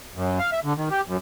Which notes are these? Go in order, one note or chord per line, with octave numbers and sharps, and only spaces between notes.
F#2
F5
E5
D3
D#3
G4
F#2